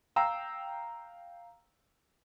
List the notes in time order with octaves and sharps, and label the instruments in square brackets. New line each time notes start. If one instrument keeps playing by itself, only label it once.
[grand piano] F5 G5 A#5 E6